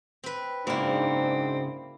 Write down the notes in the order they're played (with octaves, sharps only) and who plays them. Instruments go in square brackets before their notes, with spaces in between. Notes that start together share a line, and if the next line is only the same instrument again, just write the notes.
[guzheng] C4 B4
[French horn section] G#2 D4 [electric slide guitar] C#3 F#4 [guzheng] A#3 E4 [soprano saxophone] C4